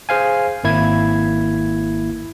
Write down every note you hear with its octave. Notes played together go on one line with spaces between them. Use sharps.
G#4 C5 F5 G#5
G#1 A#3 E4 G#6